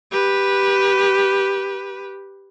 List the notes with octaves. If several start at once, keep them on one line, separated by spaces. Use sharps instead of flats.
G4 B4